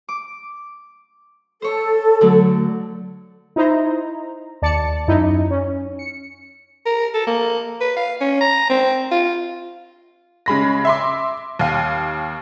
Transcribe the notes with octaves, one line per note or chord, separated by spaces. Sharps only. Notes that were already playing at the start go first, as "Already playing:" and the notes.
D6
A4 C5 C#5
D3 F#3 A3
D#4 E4 C5 A#5
D#2 D5 A5 A6 C#7
F#2 D#4 E4
C#4
C#7
A#4
A4
A#3
B4
F5
C#4
A#5
C4
F4
C#3 G#3 B5 A#6
E5 C6 D6
D#2 F5